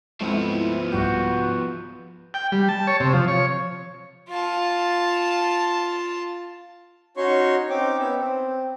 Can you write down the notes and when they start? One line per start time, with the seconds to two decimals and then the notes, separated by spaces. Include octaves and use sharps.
0.21 F3 G#3 A3 B3 C4 E4
0.92 C2 G#2 G3 F#4 G6
2.34 G5
2.52 G3
2.69 A5
2.87 C#5
3.00 C3
3.13 F3
3.28 C#5
4.29 F4 A5
7.17 C#4 D#4 F#4 C#5 C6 C#6
7.70 C4 C#4 D#4 G5 D6
7.99 B3 C#4 E5
8.18 C4